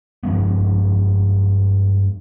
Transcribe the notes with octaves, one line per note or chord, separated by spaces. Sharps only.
G2 F3 G#3 B3